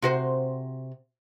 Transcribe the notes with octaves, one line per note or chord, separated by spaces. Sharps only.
C3 F#4 C5